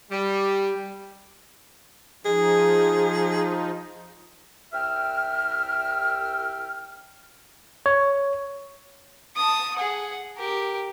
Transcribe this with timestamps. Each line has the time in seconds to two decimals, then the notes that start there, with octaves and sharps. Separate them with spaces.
0.11 G3
2.25 F3 D#4 G#4
4.73 C2 E5 G5 F6
7.86 C#5
9.37 A5 D#6
9.76 G#4 F#5
10.37 G4 A#4